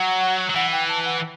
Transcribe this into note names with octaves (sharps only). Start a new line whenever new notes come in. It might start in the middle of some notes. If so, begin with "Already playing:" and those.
Already playing: F#3 F#5
F#3
E3 F#5
G5
A5
F#5